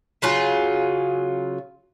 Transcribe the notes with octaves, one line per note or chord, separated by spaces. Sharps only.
C#3 F#3 F4 G#4